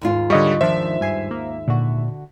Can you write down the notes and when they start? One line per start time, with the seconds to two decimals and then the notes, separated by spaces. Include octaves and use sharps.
0.01 D#2 G#2 F4
0.30 D3 G3 G#4 C#5 D#5 C#6
0.61 D#3 F3 D4 C5 E5
1.01 G2 G#5 C7
1.31 A#3
1.68 A#2 D3 F#4